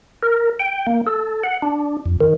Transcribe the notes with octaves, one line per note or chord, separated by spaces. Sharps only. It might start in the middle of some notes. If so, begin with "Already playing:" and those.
A#4
G5
A#3
A4
F#5
D4
F2
D#3